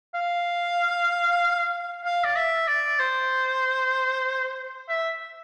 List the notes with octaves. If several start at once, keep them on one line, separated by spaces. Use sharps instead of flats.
F5
F5
D5
E5
D5
C5
E5